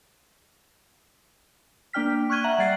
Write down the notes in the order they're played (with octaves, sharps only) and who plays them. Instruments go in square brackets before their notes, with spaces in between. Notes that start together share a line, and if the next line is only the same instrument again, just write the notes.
[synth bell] A#3 D4 D5 G5 F6 B6
C#6 F6 F#6 G#6 D#7 G7
E5 F#5 A#5 F#7
G3 D5 F#5 F#6 A6 C7